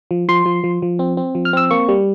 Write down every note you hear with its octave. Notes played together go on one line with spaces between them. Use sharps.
F3
F3 C6
F3
F3
F3
C4
C4
F3
F6
C4 E6
A#3 C#6
G3